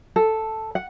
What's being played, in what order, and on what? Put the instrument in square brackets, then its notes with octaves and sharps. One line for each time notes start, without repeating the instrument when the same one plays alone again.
[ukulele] A4
F#5